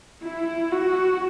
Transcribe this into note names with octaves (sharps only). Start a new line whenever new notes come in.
E4
F#4